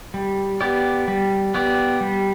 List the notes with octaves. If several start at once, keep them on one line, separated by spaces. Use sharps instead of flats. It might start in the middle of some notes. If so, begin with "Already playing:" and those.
G3
B3 G4 D5
G3
B3 G4 D5
G3